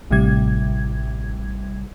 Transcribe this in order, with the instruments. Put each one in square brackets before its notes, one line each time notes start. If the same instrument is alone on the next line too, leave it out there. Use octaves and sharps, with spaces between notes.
[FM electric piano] A1 A2 C3 G3 G#6